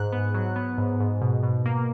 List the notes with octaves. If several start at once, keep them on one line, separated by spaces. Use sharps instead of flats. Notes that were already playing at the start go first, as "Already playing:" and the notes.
Already playing: G#2 F#6
B3
F#3
B3
G#2
G#2
B2
B2
A#3